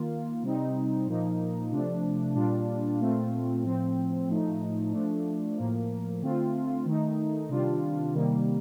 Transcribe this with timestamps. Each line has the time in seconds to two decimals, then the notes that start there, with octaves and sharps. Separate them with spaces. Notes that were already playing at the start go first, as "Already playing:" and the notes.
Already playing: D#3 A#3 F4
0.42 C3 G3 C4 D#4
1.07 A#2 F3 A#3 D#4
1.71 C3 F3 A3 D4
2.35 A#2 G3 D4 F4
2.99 A#2 A3 C4 F4
3.64 A2 F3 C4
4.28 A2 F3 A3 D#4
4.92 F3 A3 D4
5.57 A2 F3 A#3
6.21 D3 A3 C4 F4
6.85 D#3 A3 D#4
7.49 C3 D#3 G3 D4 F4
8.14 C3 D#3 G3 A#3